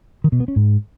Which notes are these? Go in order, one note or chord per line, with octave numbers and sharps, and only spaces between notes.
D#3
B2
B3
C#4
G#2